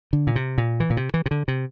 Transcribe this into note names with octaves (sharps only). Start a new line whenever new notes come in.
D3
A#2
C3
A#2
E3
A#2
C3
E3
C3
D3
C3